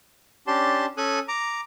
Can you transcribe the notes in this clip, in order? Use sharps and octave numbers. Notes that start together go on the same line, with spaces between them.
C#4 D4 G4 A5 C6
C#4 A4 G#5 D#6 F#6
A#5 D6